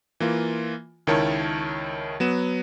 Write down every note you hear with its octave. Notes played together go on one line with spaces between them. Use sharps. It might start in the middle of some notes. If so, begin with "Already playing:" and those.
E3 A#3 F4
C#2 D#3 E4 A#4 C#5 A5
F#3 B3 E7